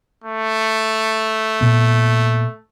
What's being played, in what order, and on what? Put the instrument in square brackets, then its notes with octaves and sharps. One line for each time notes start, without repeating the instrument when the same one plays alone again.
[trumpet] A3
[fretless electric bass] A#2 B3